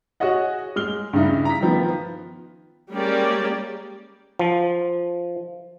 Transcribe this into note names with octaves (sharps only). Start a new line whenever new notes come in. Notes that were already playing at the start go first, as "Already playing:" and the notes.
F#4 G#4 C#5 D#5 F#5
G#3 F6 G7
G2 C#3 D#4 E4
A#5 B6
D#3 F3 B3
G3 G#3 A#3 C#4 G4 D5
F3